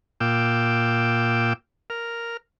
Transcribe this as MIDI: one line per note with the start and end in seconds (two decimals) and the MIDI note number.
0.21 1.53 46
0.21 1.53 65
0.21 1.53 79
0.21 1.53 86
0.21 1.53 88
1.90 2.37 70
1.90 2.37 89